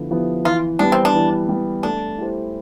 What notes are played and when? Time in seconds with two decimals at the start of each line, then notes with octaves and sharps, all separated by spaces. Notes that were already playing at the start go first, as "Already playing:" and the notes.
Already playing: D3 F3 B3 E4
0.10 F3 B3 E4 G4
0.44 E3 F4
0.79 G3 B3 D4
0.92 C4
1.05 D4
1.14 E3
1.49 G3 B3
1.83 A3 D4
2.18 E4 G4 C5